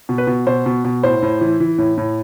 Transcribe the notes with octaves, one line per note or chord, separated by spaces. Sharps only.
B2
B4
B2
B2 C5
B2
B2
A2 C5
A2
E3
E3
A2
A2